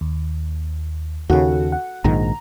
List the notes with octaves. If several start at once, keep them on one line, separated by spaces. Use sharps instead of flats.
D#2
D#2 C#3 F#4 A4 F#5
F#5
A#1 G#2 D#3 A#5